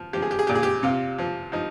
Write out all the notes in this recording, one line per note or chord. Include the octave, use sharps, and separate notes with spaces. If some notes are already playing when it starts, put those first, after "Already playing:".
Already playing: F3
F3 G4
G#4
G4
G#4
A#2 G4
G#4
G4
C3 F4
F3
F3 D#4